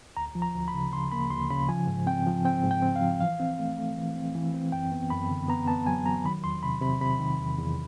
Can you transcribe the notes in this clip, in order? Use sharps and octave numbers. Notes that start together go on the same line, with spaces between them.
D2 A#5
F3
A#5
D2
B5
C#3
C#3 C6
A#3 B5
D2 C6
C#3 B5
F3 G#5
G#2
C4 G5
F3
C4 G5
G#2
G5
C4
F5
F3
E3 F5
C4
A3
A3
E3
C4
E3
C4
F#2 G5
B3
F#2 B5
D3
B3 A#5
B3 A5
F#3 G#5
F#3 A#5
D#3 B5
E2 C6
C3 B5
C3 B5
C3 B5
D#3
E2
E2